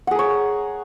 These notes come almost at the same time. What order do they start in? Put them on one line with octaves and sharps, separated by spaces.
F#5 G#4 A#4 C#5